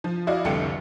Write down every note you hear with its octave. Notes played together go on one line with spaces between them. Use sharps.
F3
E4 F#4 D5 D#5 F5
F1 C2 D3 G5 C#7